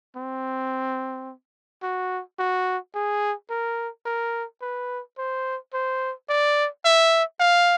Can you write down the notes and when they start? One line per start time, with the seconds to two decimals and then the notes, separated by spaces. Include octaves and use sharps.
0.16 C4
1.83 F#4
2.39 F#4
2.94 G#4
3.50 A#4
4.05 A#4
4.62 B4
5.18 C5
5.74 C5
6.29 D5
6.85 E5
7.40 F5